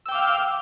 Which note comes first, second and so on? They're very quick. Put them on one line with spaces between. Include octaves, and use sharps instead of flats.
E6 G5 D6 F5